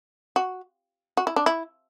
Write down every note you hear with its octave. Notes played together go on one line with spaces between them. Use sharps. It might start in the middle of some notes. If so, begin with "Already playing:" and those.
F#4
F#4
E4
D4
E4